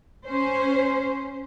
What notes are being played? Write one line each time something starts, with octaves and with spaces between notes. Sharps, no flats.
C#4 C5